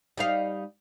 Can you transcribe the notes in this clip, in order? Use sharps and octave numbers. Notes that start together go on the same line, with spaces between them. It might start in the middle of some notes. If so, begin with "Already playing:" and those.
G3 D#4 F5